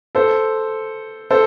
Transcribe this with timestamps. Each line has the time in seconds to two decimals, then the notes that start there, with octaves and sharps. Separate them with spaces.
0.15 A4 C5
1.30 A4 C5